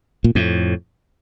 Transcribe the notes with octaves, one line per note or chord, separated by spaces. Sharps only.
A#2
F2 A2